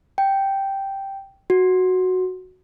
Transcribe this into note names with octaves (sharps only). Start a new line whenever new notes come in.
G5
F#4